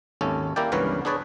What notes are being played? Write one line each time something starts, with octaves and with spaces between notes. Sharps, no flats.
G#1 D#2 C#4 A4
A#3 E4 G4 A#4 D5 G5
C#2 G2 E3 B3 A#4 C#5
D4 G#4 B4 C#5 D5